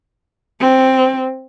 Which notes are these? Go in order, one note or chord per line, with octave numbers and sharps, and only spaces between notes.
C4